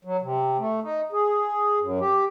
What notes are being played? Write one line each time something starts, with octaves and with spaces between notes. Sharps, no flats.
F#3
C3
A3
D#4
G#4
F#2
G4